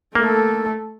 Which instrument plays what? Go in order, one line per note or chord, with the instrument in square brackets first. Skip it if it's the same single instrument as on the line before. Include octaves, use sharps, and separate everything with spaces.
[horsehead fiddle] A3 A4 [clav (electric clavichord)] A#3